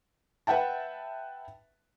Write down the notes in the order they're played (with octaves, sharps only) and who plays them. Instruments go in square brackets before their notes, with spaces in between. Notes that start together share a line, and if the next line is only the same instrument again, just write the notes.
[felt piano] B4 E5 F#5 G5 A5